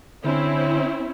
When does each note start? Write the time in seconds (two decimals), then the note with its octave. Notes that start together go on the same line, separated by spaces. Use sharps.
0.24 D3 C4 C#4 E4